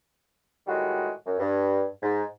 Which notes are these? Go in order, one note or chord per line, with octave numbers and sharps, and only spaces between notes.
A2 D#3 G3 G#3 F#4
F#2
G2
G#2